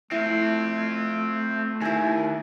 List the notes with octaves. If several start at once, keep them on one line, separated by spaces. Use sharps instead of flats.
A3 C4 E4 F4
D#2 E4 G#4